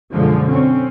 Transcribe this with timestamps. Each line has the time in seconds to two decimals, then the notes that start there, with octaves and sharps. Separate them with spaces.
0.13 F#2 B2 D3 F3 G#3
0.49 C4 C#4